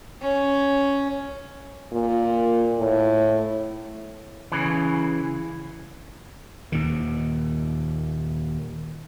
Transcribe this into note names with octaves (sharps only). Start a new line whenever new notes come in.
C#4
A#2
A2
C#3 E3
D#2 A#2 D#3